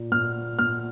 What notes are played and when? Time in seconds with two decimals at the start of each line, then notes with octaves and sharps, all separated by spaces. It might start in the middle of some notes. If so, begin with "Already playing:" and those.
Already playing: A#2
0.12 A#2 F6
0.59 A#2 F6